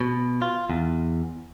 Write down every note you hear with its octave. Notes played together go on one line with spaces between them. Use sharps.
B2
F4
E2